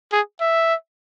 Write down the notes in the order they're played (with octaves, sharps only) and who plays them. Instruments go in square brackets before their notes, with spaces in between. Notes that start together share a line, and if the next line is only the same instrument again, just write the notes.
[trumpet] G#4
E5